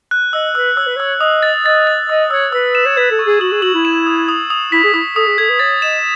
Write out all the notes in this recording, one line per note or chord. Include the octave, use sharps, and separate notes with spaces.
F#6
D#5 E6
B4 E6
C#5 E6
B4
C#5 E6
D#5 D#6
A6
D#5 A6
A6
D#5 E6
C#5 E6
B4 E6
E7
C#5
B4 G#6
A4
C#6
G#4
F#4 F#7
G#4
F#4 F#7
E4
E7
D#6
D#6
D#6
E4 B6
G#4
E4 D#6
A4 D#6
G#4
A4 G#6
B4
C#5 A6
D#5 E7